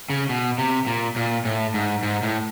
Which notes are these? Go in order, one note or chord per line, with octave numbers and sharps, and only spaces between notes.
C#3
B2
C3
A#2
A#2
A2
G#2
G#2
A2